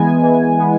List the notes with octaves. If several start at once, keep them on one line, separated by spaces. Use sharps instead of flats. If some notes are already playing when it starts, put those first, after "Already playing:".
Already playing: E3 G#3 B3 G#5
E3
G#3 B3